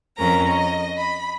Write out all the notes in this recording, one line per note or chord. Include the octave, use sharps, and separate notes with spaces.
F2 C#4 A#4 A#5
D#5
B5